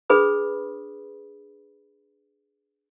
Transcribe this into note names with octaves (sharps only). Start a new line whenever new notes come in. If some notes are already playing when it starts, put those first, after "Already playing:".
D4 G#4 B4 B5 D#6